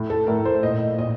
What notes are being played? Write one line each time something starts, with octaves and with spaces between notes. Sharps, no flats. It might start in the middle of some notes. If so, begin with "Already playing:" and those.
Already playing: A2
A4
A2 A#4
C5
A#2 D#5
A#2 D#5